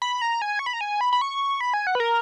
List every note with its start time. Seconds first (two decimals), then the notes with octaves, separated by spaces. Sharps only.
0.02 B5
0.22 A#5
0.42 G#5
0.59 C#6
0.66 B5
0.73 A#5
0.81 G#5
1.01 B5
1.13 B5
1.21 C#6
1.61 B5
1.74 G#5
1.87 F#5
1.95 B4
2.00 A#4